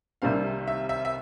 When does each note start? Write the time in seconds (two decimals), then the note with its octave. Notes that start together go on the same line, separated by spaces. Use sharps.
0.22 C2 C3 D#3 G3 C4 F5
0.67 E5
0.89 E5
1.05 E5